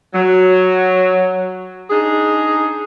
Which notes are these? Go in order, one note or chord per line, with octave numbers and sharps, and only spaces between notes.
F#3
D4 D#4 G#4